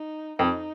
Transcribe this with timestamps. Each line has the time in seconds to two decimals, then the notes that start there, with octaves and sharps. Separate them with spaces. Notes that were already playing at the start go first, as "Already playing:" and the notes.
Already playing: D#4
0.39 F2 D#4